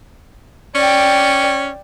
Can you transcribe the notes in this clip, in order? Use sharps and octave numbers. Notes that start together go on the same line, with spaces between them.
C#4 D5 G5